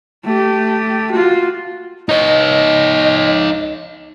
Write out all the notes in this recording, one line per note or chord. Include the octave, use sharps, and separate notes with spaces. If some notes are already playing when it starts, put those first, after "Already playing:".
A3 G4
F4 F#4
D#4 C#5 D#5